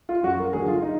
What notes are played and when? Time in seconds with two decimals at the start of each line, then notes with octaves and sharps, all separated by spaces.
0.09 F4
0.23 F#2 F#4
0.39 A#4
0.53 D3 F#3 G#4
0.68 F4
0.82 D#4